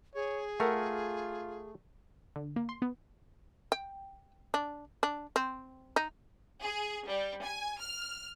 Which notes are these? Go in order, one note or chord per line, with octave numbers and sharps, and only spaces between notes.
G#4 C#5
A3 F4 A4 A#4 F#5
D3
A#3
C6
B3
G5
D4
D4
C4
D#4
G#4
G3
G#5
F6